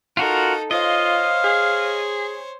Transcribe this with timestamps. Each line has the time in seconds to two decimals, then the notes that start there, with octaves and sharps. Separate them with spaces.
0.17 D#4 F4 F#4 A4 A#4
0.71 F4 C5 C#5 D#5 F5
1.44 G#4